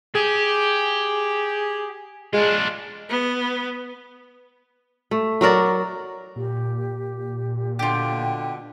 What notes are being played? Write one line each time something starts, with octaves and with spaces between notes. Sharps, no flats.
G4 G#4
G#3 D4 F4
B3
A3
F#3 F#4 A#4 D5
A#2 G4
B2 D3 F4 G4 G5